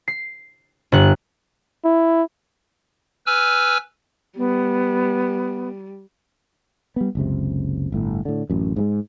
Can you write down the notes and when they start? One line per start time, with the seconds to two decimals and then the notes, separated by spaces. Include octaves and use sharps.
0.08 C7
0.92 G1 B3 F#6
1.85 E4
3.26 B4 G#5 E6 F6
4.37 G3 B3
6.96 G3 B3
7.15 F#1 C#2 C3
7.92 G1 A2
8.25 A2 D3
8.50 A1 F#2
8.76 G#2 C3 G#3